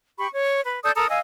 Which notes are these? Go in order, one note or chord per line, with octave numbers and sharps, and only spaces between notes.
G4 B5 C#6
C#5
B4
A4 D5 D#6 G6
A4 A#4 A#5 D#6
D#5 F5 G#5 E6